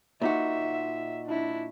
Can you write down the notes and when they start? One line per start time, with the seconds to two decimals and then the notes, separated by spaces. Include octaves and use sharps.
0.22 A#2 D#4 F#4 E5
1.26 D4 E4